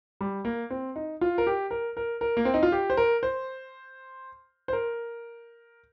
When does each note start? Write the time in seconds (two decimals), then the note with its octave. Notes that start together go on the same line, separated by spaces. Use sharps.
0.21 G3
0.45 A#3
0.70 C4
0.96 D#4
1.21 F4
1.38 A#4
1.47 G4
1.71 A#4
1.97 A#4
2.21 A#4
2.37 A#3
2.45 C4
2.54 D#4
2.63 F4
2.72 G4
2.90 C5
2.97 A#4
3.23 C5
4.68 C5
4.73 A#4